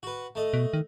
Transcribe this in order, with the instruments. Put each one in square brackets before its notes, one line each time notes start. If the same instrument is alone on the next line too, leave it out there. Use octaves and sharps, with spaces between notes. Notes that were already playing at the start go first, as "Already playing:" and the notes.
[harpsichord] F#4 B4
A3 D#5
[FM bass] B2
D#3